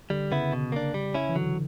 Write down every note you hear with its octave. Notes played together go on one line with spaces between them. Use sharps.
D3 G3
C#3 B3 E4
B2
A#3 D4
G3
C#4 E4
E3
D3 F#3